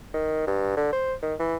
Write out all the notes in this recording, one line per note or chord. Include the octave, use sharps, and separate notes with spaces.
D#3
G2
D3
C5
D#3
E3